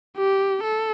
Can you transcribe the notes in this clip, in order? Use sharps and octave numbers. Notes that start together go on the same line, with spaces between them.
G4
A4